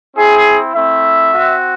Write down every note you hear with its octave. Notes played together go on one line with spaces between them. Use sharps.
C4 E4 G#4
A3 C4 E4 E5
C4 F#4